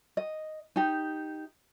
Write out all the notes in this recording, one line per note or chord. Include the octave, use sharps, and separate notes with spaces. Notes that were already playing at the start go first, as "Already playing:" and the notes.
D#5
D#4 G4